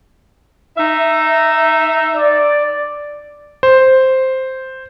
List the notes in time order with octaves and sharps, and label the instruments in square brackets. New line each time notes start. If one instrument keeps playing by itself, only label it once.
[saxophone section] D#4 E5
[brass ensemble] D5
[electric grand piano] C5